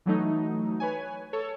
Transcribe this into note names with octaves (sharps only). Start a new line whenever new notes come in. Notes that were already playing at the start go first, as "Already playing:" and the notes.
E3 F#3 A3 D#4
B4 C#5 G#5
A4 C#5